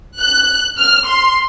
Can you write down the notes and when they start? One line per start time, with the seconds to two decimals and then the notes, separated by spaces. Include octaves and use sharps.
0.20 F#6
0.78 F6
1.07 C6